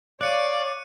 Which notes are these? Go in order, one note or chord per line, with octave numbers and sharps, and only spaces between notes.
C#5 D5 F5 D6 F#6 C#7 D#7